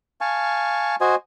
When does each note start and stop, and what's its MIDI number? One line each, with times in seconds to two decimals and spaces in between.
0.21 0.95 77
0.21 0.95 80
0.21 0.95 81
0.21 0.95 85
1.01 1.15 66
1.01 1.15 72
1.01 1.15 75
1.01 1.15 80